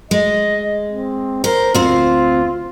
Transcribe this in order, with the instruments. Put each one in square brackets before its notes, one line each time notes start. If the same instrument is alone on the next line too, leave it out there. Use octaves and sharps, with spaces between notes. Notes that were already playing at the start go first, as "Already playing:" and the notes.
[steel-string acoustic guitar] G#3 [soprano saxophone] D#5
[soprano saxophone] C4
[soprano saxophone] A#4 [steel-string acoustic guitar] C5
[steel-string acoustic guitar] D2 C4 [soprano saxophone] F4